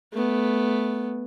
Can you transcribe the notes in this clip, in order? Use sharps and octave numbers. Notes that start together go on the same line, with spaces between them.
A3 B3